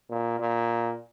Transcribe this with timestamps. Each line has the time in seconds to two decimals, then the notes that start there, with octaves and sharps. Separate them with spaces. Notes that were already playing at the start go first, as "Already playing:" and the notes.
0.10 A#2
0.40 A#2